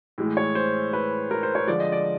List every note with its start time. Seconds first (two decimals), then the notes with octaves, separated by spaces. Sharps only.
0.18 A2 E3 G#3
0.37 C#5
0.55 C5
0.93 B4
1.31 A#4
1.43 C5
1.55 C#5
1.67 D3 F3 G#3 D5
1.80 D#5
1.92 D5